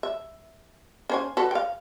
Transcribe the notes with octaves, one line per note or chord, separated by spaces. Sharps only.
E5
C#4 C5 G#5
F#4 A4 B4
F5 G5